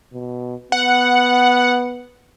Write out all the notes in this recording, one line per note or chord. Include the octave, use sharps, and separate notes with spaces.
B2
B3 F#5